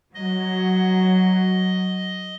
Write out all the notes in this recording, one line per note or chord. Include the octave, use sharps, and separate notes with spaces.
F#3 D#5